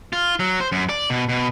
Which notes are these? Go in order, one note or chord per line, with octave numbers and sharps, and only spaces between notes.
F4
F#3
C5
F#2
D5
B2
B2